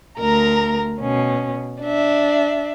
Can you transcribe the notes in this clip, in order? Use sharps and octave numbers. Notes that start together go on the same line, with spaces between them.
D2 A#4 A#5
B2 C#4
D4 E5